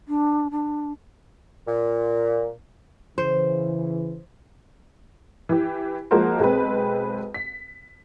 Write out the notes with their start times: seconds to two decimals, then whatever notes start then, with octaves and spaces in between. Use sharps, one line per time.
0.08 D4
0.51 D4
1.67 A#2
3.18 C#3 E3 C5
5.49 E3 G4
6.11 F3 G#3 A#3 F#4 A#4 C5
6.39 B1 G#3 C4 B4
7.34 B6